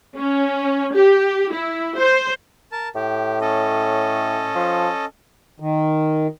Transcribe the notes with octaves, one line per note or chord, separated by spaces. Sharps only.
C#4
G4
E4
C5
A#4 A5
A2 G4
C#4 A4 D#5
F3
D#3